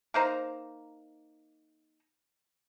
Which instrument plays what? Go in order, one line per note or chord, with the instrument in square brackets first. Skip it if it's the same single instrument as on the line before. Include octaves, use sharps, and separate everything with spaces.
[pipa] A#3 D#4 C5 A#5